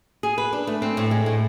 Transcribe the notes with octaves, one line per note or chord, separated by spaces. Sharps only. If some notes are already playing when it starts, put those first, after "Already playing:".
G#4
B4
D4
A3
C4
A2
G#3
A2